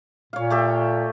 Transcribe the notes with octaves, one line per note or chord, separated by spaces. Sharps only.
A#2 C#5 F5
A3 G4 A4